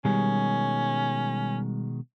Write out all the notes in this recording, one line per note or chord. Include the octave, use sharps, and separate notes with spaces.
B2 D#3 G3 G#3 C#4